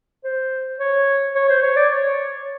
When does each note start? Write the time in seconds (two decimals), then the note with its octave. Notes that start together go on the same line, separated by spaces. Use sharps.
0.24 C5
0.80 C#5
1.35 C#5
1.49 C5
1.62 C#5
1.76 D5
1.91 C#5